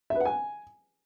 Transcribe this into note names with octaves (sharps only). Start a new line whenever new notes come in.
E5
B4
F#5
G#5